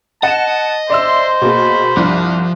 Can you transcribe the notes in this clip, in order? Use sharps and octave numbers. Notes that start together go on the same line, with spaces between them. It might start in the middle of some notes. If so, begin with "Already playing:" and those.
D#5 F#5 A5 E7
C5 D5 E5 C6 E6
B2 A#3 G#4 B5
C2 G2 F3